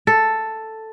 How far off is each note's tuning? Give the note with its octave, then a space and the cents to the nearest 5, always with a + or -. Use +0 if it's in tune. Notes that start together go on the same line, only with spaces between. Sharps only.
A4 +5